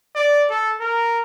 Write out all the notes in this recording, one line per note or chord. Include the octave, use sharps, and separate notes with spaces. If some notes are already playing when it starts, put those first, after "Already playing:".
D5
A4
A#4